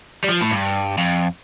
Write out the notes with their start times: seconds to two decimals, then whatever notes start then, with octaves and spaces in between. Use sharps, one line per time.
0.24 G3
0.29 F3
0.41 A2
0.52 G2
0.98 F2